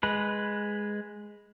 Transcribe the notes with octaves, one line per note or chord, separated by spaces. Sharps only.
G#3 B4